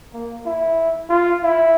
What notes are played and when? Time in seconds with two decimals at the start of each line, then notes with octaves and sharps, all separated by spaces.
0.14 A#3
0.46 E4
1.10 F4
1.43 E4